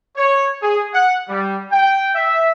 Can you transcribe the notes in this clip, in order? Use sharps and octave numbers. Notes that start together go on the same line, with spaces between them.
C#5
G#4
F#5
G3
G5
E5